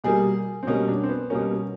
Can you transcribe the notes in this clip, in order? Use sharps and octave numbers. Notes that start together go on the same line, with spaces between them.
B2 G3 A#3 G#4
C4
B2 G3 A#3 C#4
D4
C4
B3
B2 G3 A#3 C#4